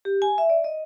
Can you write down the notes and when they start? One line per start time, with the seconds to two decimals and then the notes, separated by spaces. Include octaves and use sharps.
0.05 G4
0.22 G#5
0.38 E5
0.50 D5
0.64 D#5